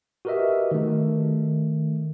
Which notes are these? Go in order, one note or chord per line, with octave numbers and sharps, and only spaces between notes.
F#4 G4 A#4 B4 D#5 E5
D#3 A3